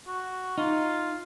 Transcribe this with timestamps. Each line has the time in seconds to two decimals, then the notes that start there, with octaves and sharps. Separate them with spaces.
0.07 F#4
0.58 D#4 F4